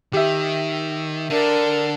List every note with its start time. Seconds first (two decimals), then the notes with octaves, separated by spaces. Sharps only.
0.13 D#3 G4 E5
1.30 D3 D4 A#4